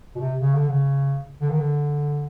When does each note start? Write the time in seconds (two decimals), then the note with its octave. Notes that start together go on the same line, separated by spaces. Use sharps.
0.15 B2
0.21 C3
0.40 C#3
0.54 D3
0.68 C#3
1.41 D3
1.50 D#3
1.59 D3